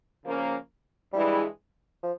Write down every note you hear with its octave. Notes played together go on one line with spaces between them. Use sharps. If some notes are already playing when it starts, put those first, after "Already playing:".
C#3 F3 A#3 C#4
G2 E3 G3 G#3 E4 G#4
F3